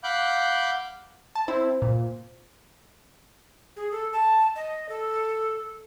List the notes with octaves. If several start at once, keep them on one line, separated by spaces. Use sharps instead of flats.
F5 F#5 B5 D6 F#6 G6
A5
C4 E4 C5
A#2
G#4
A4
A5
D#5
A4